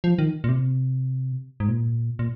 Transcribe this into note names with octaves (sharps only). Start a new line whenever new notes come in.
F3
D#3
A#2
C3
G#2
A#2
A#2